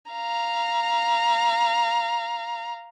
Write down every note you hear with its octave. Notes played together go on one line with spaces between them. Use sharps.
F5 A#5